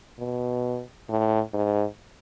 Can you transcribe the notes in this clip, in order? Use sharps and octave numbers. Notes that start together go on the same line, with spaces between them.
B2
A2
G#2